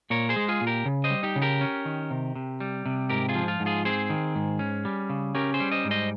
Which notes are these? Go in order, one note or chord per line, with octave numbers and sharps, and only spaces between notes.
A#2 A#4 C#5
G#4 C5
G#3
F4 G#4
A#2
G4 A#4
C#3
C5 D#5
G3
D#4 G4
C#3
G4 A#4
C#4
D#3
C3
C3
G3
C3
G#2 G4 A#4
F4 G#4
F3
F4
G#2
F4 G#4
C4 G#4 C5
D#3
G#2
C#4
G3
C#3
C#4 G4 A#4
G#4 C5
G3
C5 D#5
G#2
C5 D#5